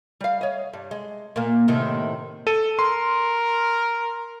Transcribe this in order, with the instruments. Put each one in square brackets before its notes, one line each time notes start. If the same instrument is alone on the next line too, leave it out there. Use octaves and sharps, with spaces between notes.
[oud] G3 F5
C#5 D#5
G2
G#3
A#2 A#3
A2 C3 D#3
[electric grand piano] A4 D#7
[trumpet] A#4 [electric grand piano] C6